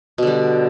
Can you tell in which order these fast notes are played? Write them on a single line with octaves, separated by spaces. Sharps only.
B2 D3 G3